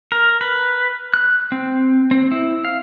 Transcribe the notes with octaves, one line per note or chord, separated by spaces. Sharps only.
A#4
B4
F#6
C4
C4
E4
F5